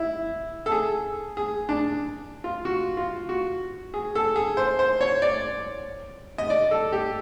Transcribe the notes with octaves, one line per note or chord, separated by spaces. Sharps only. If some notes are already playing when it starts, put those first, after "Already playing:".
Already playing: E4
A4
G#4
G#4
D4
F4
F#4
F4
F#4
G#4
A4
G#4
C5
C5
C#5
D5
D#5
D5
A4
G4